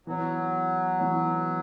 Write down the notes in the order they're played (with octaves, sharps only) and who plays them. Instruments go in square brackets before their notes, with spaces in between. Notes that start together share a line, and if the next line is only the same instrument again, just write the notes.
[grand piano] E3 B3 F#4 C#5 [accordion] F#3
[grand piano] E3 B3 F#4 C#5